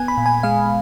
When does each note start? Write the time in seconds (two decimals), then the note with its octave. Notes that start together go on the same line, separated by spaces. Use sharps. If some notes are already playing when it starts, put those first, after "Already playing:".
Already playing: B3 G#5
0.08 B5
0.17 A#2
0.26 G#5
0.43 G#3 F5